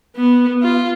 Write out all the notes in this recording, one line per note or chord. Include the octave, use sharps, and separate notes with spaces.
B3
F4